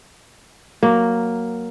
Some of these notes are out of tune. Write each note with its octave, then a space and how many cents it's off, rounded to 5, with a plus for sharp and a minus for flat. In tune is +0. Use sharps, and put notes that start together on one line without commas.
F#3 +0 A#3 +0